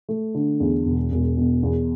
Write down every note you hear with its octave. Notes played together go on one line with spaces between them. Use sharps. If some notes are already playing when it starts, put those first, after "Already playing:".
A3
D3
E2
E1
E1
B2
E2